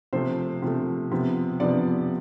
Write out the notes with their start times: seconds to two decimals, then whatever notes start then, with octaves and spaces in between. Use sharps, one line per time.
0.13 C3 F3 A3 C5
0.62 C3 F3 A3
1.11 C3 F3 B3
1.60 C3 F3 B3 D5